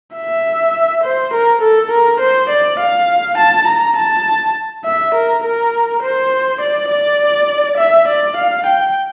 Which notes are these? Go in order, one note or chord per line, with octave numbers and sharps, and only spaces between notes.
E5
C5
A#4
A4
A#4
C5
D5
F5
A5
A#5
A5
E5
A#4
A#4
C5
D5
D5
E5
D5
F5
G5